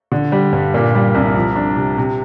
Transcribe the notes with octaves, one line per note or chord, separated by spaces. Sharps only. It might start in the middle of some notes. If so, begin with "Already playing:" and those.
D3
G3
G2
A#2
G3
C2
F3
D4
C3
C3